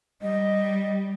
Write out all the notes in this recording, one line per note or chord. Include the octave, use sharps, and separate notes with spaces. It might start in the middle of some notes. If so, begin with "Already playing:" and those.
G3 D#5